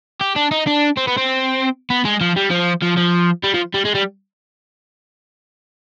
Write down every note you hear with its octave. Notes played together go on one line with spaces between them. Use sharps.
G4
D4
D#4
D4
C4
B3
C4
B3
G#3
F3
G3
F3
F3
F3
G3
F3
G3
G#3
G3